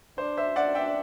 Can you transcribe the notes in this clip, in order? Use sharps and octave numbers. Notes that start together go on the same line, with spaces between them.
D4 C5
C5 E5
D4 D5 F#5
E5 G5